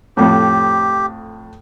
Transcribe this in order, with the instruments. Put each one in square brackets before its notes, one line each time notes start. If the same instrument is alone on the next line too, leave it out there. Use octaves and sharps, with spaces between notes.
[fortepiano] F2 A2 [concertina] G4